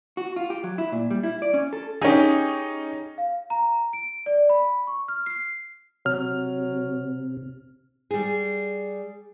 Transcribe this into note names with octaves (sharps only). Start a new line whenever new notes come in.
F#4
F4
G4
F#3
E4
A#2
G3
E4
D5
C#4
A4
C#4 D#4 G4 G#4
F5
A#5
D7
D5
B5
C#6
F6
C7
C3 F#3 F6
G3 G#4